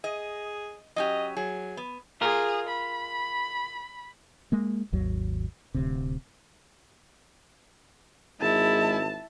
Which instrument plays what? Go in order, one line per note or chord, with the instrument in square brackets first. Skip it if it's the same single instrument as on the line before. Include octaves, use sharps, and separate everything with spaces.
[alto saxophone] G#4 [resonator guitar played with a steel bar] D#5
[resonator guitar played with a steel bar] F#3 C#4 G4 [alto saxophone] D#5
[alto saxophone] F#3 [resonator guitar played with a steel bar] G#4
[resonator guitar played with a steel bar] B3
[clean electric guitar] F4 A#4 [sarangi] G#4
[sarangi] B5
[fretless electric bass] G#3 A#3
G#1 D#2 F#3
D1 D2 C3
[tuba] G#1 [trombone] G#3 [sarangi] E4 [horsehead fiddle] A5